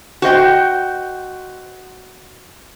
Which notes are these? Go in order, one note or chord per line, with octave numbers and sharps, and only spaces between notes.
F#4 C5 D#5 G5